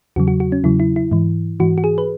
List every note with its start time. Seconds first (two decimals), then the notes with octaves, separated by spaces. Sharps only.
0.16 E2 C#3 F#3 F#4
0.28 F#4
0.40 F#4
0.52 C#4
0.64 E2 C#3 F#3 E4
0.80 E4
0.96 E4
1.12 G#2 E3
1.60 G#2 E3 F#4
1.78 F#4
1.84 G#4
1.98 B4